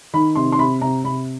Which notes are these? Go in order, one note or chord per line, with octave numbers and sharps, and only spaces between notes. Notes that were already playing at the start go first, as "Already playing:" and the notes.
D#3 B5
C3 C6
C6
C3 B5
C3 A#5
C3 B5